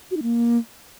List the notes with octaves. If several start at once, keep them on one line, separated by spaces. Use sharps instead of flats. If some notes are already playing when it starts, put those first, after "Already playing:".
F#4
D#4
A#3